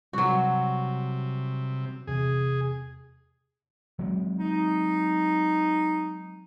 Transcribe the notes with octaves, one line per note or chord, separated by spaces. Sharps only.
C3 F#3 G3 F#4
E2 C3 G#4
F#3 G#3 C4
D#4